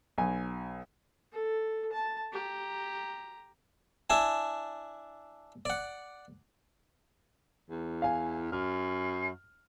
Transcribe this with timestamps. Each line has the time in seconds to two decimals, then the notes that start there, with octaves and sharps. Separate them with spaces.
0.18 B1 G#5
1.33 A4
1.93 A5
2.33 G4 A#5
4.10 D4 E4 G#5 A5
5.65 D5 F#5
7.70 E2
8.02 F5 G#5
8.52 F#2 F6